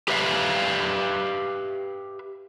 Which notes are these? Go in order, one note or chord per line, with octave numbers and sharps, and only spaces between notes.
G4 B4 E5 F5